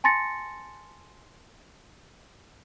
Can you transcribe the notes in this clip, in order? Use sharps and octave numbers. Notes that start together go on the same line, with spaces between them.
G#5 A5 C6 A6 A#6 C#7